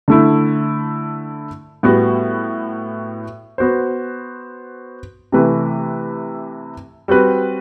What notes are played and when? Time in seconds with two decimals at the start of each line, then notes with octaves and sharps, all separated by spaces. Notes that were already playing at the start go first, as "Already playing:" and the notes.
0.08 D3 A3 E4
1.83 A2 G3 B3 F#4
3.58 B3 F#4 C5
5.32 C3 E3 A3 E4 B4
7.08 G3 C4 F#4 B4